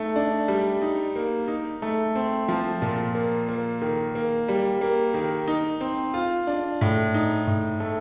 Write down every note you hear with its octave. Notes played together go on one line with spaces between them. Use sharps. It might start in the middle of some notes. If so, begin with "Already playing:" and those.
Already playing: A3 D#4
D4
G3
D#4
A#3
D#4
A3
C4
F3
A#2
A#3
A#3
D#3
A#3
G3
A#3
D#3
D#4
C4
F4
D4
A2
D#4
A2
A3